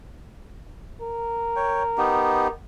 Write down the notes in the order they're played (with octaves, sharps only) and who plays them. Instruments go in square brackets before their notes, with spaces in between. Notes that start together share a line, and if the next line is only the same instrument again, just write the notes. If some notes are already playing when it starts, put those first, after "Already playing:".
[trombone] A#4
[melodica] C#5 G5
B3 D#4 G4